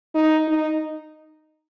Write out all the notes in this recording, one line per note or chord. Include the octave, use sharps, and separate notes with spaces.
D#4
D#4